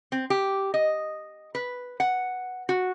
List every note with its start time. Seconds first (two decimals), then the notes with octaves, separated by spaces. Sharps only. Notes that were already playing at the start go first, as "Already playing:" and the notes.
0.12 C4
0.30 G4
0.74 D#5
1.55 B4
2.00 F#5
2.69 F#4